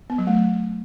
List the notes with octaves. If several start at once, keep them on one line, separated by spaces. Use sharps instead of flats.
B3
F#3
A3